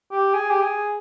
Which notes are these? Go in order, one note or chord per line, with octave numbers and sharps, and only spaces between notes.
G4
G#4
G4
G#4